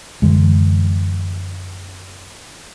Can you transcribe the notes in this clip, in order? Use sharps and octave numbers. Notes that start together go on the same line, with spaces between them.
F#2 D3 E3 G#3